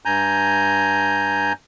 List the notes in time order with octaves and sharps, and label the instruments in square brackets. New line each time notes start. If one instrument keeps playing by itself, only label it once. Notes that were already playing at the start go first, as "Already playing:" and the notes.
[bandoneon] G2 G#5 A#5 G6